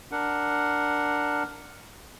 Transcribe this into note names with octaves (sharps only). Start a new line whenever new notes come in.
D4 A#4 F#5